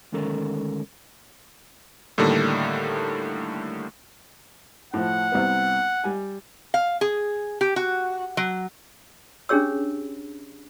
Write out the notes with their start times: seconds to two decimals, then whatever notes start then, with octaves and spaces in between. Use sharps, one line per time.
0.12 D2 D#3 G#3 C#4 A4 A#4
2.18 A2 D3 D#3 G3 A3 A#3
4.94 A2 F3 F#5
5.32 C2 C3 B3
6.04 G3 G#5
6.74 F5
7.01 G#4
7.61 G4
7.76 F#4
8.37 F#3
9.49 C#4 D4 G4 G#4 C#5 E6